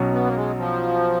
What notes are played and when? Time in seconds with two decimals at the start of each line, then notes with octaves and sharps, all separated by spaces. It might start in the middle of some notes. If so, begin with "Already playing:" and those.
Already playing: B1 B2 F#3 C#4
0.13 B3
0.24 A#3
0.36 G#3
0.58 F3